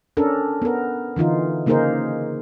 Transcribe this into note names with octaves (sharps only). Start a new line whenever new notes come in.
C#4 D4 A4 A#4
B3 A#4
D3 E3 D#4 F4
C#3 A#3 D#4 G#4 A#4 C5